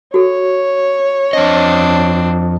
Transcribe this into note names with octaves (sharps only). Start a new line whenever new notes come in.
F#4 A4 C#5
F2 C4 D4 D#5